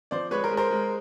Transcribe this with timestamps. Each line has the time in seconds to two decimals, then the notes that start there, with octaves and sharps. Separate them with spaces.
0.11 F3 C5 D5
0.31 G#3 B4 C#5
0.44 A#4 C5
0.51 G#3
0.57 A#4 C5
0.71 G#3